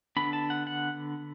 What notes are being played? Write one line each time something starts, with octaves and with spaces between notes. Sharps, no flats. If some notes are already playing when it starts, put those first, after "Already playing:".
D3 B3 D4 B5
A5
F#5
F#5